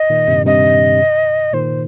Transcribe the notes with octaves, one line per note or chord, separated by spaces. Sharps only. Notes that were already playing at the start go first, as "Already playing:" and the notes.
Already playing: D#5
A#2 D#3
G2 C3
G2 C3 D#5
A#2 D#3 C5